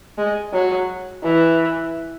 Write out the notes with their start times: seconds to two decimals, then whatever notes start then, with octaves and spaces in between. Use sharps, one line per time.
0.18 G#3
0.53 F#3
1.23 E3